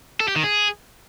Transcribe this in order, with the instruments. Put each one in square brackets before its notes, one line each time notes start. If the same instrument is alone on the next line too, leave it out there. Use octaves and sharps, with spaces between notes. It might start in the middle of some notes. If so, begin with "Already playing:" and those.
[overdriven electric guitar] A4
G4
D#3
G#4